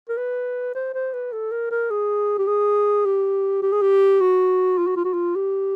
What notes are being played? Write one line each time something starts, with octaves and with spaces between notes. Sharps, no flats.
A#4
B4
C5
C5
B4
A4
A#4
A#4
G#4
G4
G#4
G4
G4
G#4
G4
F#4
F4
F#4
F4
F#4
F4
G4